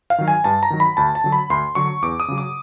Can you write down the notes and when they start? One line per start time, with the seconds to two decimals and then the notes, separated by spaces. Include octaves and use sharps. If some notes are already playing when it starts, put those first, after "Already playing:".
0.10 F5
0.18 D#3 F#3
0.28 G#5
0.44 G2 A5
0.63 A#5
0.70 D#3 F#3
0.80 B5
0.97 D2 A5
1.15 A5
1.24 D3 F#3
1.32 B5
1.50 D2 C6
1.75 D3 F#3 C#6
2.02 E2 D6
2.20 D#6
2.28 C#3 F#3
2.38 D6